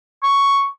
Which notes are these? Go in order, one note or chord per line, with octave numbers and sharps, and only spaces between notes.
C#6